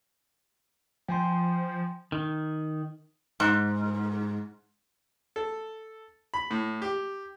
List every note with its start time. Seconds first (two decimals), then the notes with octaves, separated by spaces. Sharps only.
1.08 F3 G5 G#5 C6
2.12 D#3
3.40 G#2
5.36 A4
6.34 B5
6.51 A2
6.82 G4